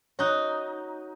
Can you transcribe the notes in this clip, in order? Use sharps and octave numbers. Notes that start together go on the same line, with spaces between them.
D#4 F#4 C#5 F#6